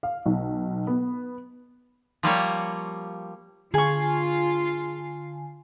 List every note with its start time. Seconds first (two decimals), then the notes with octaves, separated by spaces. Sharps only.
0.03 F5
0.26 B1
0.87 B3
2.23 F3 G3 A#3 C#5
3.74 D3 F4 G#4 G#5 C#6